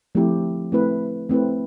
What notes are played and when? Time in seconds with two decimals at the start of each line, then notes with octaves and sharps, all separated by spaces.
0.15 F3 A3 C4 E4 G4
0.72 A3 C4 E4 B4
1.29 A3 C4 E4 B4